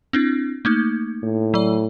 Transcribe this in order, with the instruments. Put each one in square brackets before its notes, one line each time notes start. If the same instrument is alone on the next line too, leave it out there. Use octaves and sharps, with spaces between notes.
[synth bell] C4 D4 E4
A3 A#3 D#4
[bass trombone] A2
[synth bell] F#3 D5